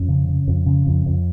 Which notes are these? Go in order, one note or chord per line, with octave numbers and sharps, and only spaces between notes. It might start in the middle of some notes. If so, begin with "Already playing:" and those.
Already playing: F2 C#4
C#3
C#3
F2
C#3
F2
F2